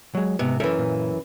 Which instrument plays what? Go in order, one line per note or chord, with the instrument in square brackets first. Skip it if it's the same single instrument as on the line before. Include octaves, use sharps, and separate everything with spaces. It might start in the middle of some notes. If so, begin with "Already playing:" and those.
[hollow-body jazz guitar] F#3 G#3
[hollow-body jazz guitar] G#2 B3 [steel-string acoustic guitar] C3
[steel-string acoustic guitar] F#2 E3 [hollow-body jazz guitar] A4 A#4 E5
[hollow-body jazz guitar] A#2